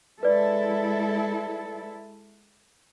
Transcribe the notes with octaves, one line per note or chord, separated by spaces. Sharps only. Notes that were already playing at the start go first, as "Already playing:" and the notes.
G#3 E4 A4 B4 D5